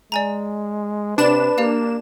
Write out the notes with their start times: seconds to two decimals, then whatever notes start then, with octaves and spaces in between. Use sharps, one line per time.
0.12 G#3 D5 G#5 A#5
1.18 C3 D4 B4 E7
1.58 A#3 G4 D5 F5